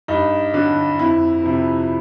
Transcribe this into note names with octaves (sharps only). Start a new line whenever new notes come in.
G2 D#4
D3 F#3
F2 E4
C3 F3